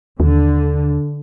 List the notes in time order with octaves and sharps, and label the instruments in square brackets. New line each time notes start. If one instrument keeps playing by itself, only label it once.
[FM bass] D#2 [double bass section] D3